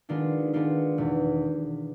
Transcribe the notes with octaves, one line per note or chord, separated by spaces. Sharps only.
D#3 G#3 B3 D4 F4
D#3 G#3 B3 D4 F4
E2 B2 G#3